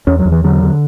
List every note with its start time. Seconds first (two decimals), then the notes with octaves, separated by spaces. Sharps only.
0.07 E2 C#4
0.19 F#3
0.25 E2
0.32 E3
0.44 D3 F#3
0.63 D3